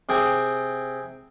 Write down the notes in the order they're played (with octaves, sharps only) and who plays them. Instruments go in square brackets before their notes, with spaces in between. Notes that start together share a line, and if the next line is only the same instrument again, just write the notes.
[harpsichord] C3 G#4 G5 G#5